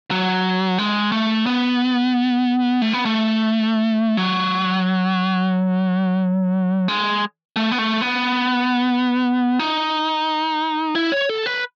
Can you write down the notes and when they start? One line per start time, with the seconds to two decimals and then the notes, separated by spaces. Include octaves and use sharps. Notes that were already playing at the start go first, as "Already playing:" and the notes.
0.11 F#3
0.78 G#3
1.12 A3
1.46 B3
2.82 A3
2.93 B3
3.05 A3
4.17 F#3
6.88 G#3
7.56 A3
7.71 B3
7.78 A3
8.02 B3
9.59 D#4
10.95 E4
11.12 C#5
11.29 A4
11.46 B4